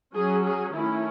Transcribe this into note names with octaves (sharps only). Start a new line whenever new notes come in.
F#3 C#4 G#4
G#4
D#3 A3 C#4 E4